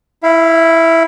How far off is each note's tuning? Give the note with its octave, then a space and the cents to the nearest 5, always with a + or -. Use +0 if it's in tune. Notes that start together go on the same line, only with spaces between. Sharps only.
E4 +0 F5 -35